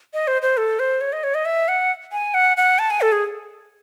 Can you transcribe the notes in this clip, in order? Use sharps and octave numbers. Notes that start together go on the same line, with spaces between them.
D#5
C5
C5
A4
C5
C#5
D#5
C#5
D#5
E5
F#5
G#5
F#5
F#5
A5
G#5
A4
G#4